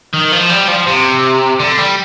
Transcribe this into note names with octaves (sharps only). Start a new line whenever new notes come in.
D#3
F3
G3
F3
C3
D3
G3